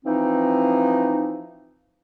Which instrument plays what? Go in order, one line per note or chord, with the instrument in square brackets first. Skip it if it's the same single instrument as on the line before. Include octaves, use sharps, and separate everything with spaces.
[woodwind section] E3 F3 C4 D#4